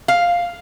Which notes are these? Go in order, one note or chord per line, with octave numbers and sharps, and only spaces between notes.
F5